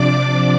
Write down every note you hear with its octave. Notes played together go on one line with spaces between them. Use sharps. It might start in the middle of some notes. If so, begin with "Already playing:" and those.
Already playing: C3 F3 D4 D5 D6